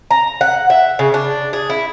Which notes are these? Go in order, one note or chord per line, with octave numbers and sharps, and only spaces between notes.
A#5
F#5
E5
C#3
D4
G#4
E4